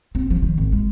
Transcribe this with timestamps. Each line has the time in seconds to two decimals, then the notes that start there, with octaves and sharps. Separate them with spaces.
0.15 C4
0.30 F3
0.42 D#3
0.58 G#1
0.72 G#3